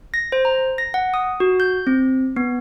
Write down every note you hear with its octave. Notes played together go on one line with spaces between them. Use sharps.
A#6
C5
A#5
A#6
F#5
D#6
F#4
G6
C4
B3